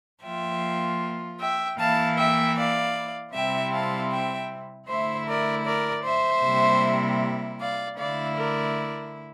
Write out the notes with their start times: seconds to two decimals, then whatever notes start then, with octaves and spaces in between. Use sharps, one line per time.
0.23 F3 A#3 F4 E5 G5
1.40 E5 G5
1.78 E3 A#3 E4 F5 A5
2.17 E5 G5
2.56 D5 F5
3.33 C3 G3 C4 E4 E5 G5
3.72 F5 A5
4.11 E5 G5
4.88 D3 A3 E4 C5 E5
5.27 A#4 D5
5.65 A#4 D5
6.04 C5 E5
6.44 C3 G3 A#3 E4
7.60 D5 F5
7.98 D3 A3 E4 D5 F5
8.36 A#4 D5